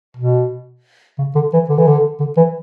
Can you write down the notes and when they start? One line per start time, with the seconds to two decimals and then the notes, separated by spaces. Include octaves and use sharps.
0.17 B2
1.18 C#3
1.35 D3
1.53 E3
1.69 D3
1.78 E3
1.88 D3
2.20 D3
2.37 E3